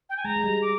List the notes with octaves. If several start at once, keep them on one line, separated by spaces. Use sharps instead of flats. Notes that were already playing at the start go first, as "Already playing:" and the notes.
G5
G#5
G#3 A#5
G#3
G3
D6